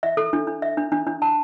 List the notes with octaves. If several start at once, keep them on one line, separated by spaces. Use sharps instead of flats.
E5
A4
D4
D4
E5
D4
D4
D4
A5